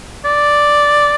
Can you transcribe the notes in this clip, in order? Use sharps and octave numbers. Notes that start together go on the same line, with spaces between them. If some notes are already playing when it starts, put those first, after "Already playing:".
D5